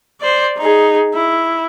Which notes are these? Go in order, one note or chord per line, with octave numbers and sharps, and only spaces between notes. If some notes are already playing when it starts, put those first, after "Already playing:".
C5 D5
D#4 G#4
E4